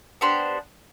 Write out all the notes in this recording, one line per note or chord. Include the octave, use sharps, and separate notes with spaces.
B3 D4 G4 C5